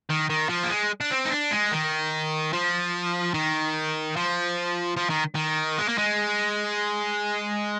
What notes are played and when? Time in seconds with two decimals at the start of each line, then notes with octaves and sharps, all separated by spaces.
0.10 D#3
0.30 D#3
0.49 F3
0.64 A#3
0.69 G#3
1.00 D4
1.11 C4
1.25 D#4
1.31 D4
1.51 G#3
1.72 D#3
2.53 F3
3.34 D#3
4.16 F3
4.97 F3
5.10 D#3
5.35 D#3
5.78 G#3
5.88 A#3
5.98 G#3